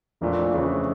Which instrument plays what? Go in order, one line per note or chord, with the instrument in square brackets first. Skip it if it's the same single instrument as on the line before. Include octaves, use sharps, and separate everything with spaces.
[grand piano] F1 F2 E3 A3 D4 [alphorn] A#2
[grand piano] F1 F2 E3 A3 D4 [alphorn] C#3